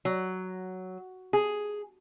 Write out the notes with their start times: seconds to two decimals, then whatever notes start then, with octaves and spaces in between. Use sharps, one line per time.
0.05 F#3
1.33 G#4